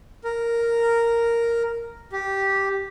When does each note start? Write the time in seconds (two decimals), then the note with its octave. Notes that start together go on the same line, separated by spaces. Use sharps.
0.24 A#4
2.12 G4